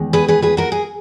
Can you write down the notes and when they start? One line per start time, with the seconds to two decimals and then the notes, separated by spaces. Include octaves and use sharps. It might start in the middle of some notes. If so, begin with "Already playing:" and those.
Already playing: E2 D#3 G#3
0.13 G#4 B4
0.28 G#4 B4
0.42 G#4 B4
0.57 F#4 A#4
0.72 G#4